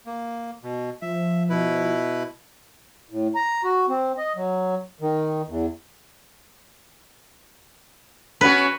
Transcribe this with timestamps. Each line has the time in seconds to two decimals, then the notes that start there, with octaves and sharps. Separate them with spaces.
0.06 A#3
0.63 B2
1.02 F3 E5
1.49 B2 E4 B4
3.10 A2
3.35 A#5
3.64 F#4
3.88 C4
4.17 D#5
4.36 F#3
5.01 D#3
5.48 E2
8.41 B3 C#4 F#4 B4